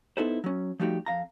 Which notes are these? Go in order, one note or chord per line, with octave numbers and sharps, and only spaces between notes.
B3 D#4 E4 A4 B4 C5
F#3 C#4
F3 G3 A3 D#4 F#4 G4
F2 F5 A#5